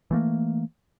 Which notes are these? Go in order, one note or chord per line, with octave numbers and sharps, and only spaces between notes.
E3 A3 A#3